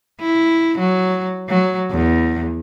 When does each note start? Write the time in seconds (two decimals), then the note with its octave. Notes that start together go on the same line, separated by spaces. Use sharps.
0.20 E4
0.78 F#3
1.49 F#3
1.91 E2